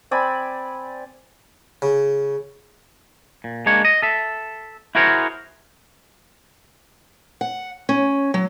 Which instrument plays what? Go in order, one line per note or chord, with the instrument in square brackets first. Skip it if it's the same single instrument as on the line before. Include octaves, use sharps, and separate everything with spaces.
[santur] C4 D5 G#5 B5
[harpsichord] C#3
[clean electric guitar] A#2
G#3 A#3 D4 C#5
D#5
A4 E5
E4 F#4 G#4 A#4 C5 C#5
[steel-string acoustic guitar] F#5
C#4
F#3